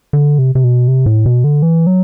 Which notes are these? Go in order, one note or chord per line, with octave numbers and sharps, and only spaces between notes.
D3
C3
C3
B2
C3
A2
B2
D3
E3
F#3